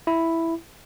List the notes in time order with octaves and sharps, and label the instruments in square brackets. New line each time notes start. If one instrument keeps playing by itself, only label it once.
[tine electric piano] E4